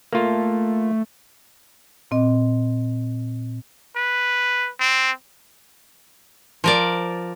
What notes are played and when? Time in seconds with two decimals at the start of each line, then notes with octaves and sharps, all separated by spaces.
0.13 A3 A#3 F4
2.11 A#2 C4 D#5
3.96 B4
4.80 C4
6.64 F3 A#4 D5